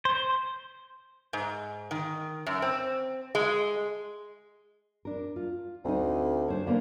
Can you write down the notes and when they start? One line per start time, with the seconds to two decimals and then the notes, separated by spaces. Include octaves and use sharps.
0.05 C5
1.33 G#2
1.91 D#3
2.46 F#2
2.62 C4
3.35 G#3
5.05 D4 A#4
5.36 F4
5.85 D2 C4 D#4
6.48 D4 C5 C#5
6.67 D3 A#3 B3